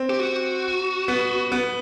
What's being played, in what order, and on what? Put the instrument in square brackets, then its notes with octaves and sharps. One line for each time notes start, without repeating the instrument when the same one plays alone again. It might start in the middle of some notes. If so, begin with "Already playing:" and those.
Already playing: [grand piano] C4
[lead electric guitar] G4
F#4
[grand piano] B3
B3